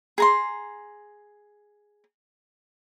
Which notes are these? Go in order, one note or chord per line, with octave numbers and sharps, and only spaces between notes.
G#4 A#5 C6